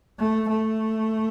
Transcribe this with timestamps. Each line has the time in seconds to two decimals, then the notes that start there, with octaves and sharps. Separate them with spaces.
0.19 A3
0.49 A3